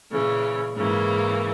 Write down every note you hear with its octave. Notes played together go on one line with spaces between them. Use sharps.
A#2 C#3 E3
G#2 C#3 E3 A#3